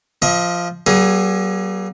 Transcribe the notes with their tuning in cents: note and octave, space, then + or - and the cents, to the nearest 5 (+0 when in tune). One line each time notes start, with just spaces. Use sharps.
F3 -5 D#5 +35 C#6 +10
F#3 +45 A#3 +35 G#4 +0